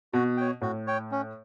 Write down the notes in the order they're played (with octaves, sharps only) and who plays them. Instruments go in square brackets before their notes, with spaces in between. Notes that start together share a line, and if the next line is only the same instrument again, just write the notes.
[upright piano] B2 [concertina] F#4
[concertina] C#5 G5
[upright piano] A2 [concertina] F#4
[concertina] C#5 G5
C#4